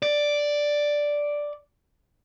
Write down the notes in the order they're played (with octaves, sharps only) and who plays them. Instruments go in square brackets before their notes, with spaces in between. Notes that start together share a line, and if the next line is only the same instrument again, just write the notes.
[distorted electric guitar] D5